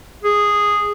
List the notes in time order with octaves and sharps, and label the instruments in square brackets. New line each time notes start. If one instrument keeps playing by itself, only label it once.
[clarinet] G#4